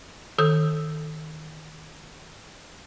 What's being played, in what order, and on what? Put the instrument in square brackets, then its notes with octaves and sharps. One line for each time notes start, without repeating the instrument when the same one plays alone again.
[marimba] D#3 A4 D#6 G6